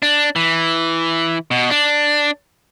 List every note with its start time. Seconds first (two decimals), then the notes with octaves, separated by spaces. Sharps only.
0.02 D4
0.36 E3
1.51 B2
1.70 D4